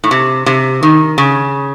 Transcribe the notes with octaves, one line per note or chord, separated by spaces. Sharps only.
A2
C3
C3
D#3
C#3